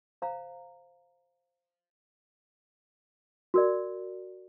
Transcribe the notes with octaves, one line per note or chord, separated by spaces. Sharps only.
C5 F5 A#5
F#4 A#4 D5